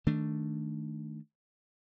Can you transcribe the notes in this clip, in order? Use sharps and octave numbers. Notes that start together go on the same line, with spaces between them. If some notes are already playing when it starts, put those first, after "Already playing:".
D#3 A3 D4